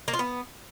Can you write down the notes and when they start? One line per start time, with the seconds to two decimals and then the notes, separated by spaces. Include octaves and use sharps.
0.08 A#3
0.13 F4
0.19 B3